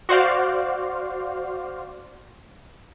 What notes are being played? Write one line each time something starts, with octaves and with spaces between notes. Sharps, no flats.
F#4 C5 D5 F5